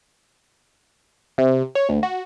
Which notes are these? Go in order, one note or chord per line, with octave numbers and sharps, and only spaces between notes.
C3
C#5
D2
F#4